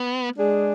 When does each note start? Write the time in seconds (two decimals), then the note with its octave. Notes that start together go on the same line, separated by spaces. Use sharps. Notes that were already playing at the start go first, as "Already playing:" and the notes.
Already playing: B3
0.36 G#3 D4 G#4